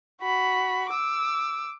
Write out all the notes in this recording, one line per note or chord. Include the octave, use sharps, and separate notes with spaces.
F#4 B5
D6 E6